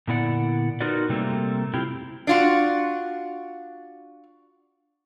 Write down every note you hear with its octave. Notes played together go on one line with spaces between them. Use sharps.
A#2 D3 B3 E4 D5 F#5
D#4 F4 F#4 A#4 B4 D5
C3 G3 A3 A#3 C4
C3 C4 E4 F4 G4
D4 F4 F#4